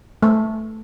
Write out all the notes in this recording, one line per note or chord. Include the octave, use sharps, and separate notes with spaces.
A3